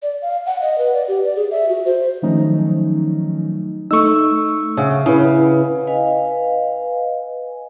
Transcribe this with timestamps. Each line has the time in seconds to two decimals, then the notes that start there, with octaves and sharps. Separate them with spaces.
0.03 D5
0.22 F5
0.46 F#5
0.61 D#5
0.78 B4
0.93 D5
1.08 G4
1.25 D5
1.36 G#4
1.51 E5
1.69 F#4
1.85 C5
2.22 D#3 F3 F#3 A3 C#4 D#4
3.91 A3 D#4 C#6 E6
4.77 C#3 C#5 E5 F#5
5.06 C#3 E4 B4
5.87 B4 D#5 F5 G#5